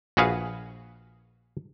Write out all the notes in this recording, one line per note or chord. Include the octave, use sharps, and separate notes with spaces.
A#1 F#4 G#4 B4 F5